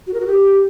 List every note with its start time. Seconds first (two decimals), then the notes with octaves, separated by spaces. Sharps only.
0.07 F#4
0.13 A#4
0.20 F#4
0.27 G4